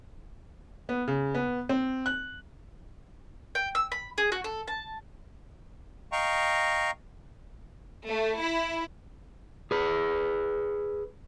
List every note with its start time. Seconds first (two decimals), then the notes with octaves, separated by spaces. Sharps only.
0.89 B3
1.08 C#3
1.34 B3
1.69 C4
2.06 F#6
3.55 G5
3.75 E6
3.92 B5
4.18 G#4
4.32 F#4
4.44 A4
4.68 A5
6.12 D#5 F5 G5 A#5 C#6
8.10 A3
8.40 E4
9.71 G#4 B4